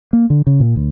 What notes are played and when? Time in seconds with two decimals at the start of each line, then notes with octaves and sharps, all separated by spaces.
0.13 A#3
0.30 D3
0.47 C#3
0.60 A#2
0.76 D2